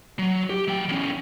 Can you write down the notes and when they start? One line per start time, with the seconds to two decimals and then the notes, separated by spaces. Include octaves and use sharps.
0.19 F#3
0.50 G4
0.68 F#3 G5
0.89 E2 C#4